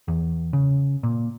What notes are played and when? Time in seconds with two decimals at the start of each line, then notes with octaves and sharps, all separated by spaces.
0.08 E2
0.53 C#3
1.03 A#2